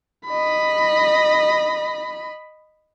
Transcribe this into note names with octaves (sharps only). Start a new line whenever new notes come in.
D#5 B5